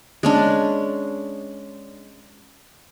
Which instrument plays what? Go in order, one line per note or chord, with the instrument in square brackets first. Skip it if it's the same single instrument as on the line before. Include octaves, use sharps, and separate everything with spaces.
[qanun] G#3 C#4 D4